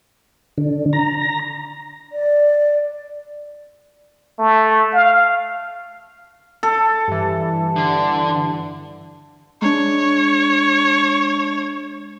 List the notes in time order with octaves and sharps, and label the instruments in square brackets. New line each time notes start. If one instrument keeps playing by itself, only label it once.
[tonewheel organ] D3
A#5
[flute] D5
[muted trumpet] A3
F5
[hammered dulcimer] A4
[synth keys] G2 E3
[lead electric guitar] D3
[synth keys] G#3 D4 [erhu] C#5